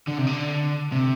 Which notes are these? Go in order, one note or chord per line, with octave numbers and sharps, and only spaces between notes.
D3
C3
D3
C3